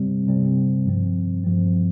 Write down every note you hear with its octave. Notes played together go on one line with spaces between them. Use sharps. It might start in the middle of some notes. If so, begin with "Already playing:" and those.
Already playing: C3 G3 C4
C3 G3 C4
G2 F3 C4
G2 F3 C4